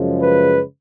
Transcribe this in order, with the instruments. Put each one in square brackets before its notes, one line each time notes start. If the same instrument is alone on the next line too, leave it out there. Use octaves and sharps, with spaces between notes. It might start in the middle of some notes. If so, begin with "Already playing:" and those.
Already playing: [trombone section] F#2 C#3 F3 G#3
B4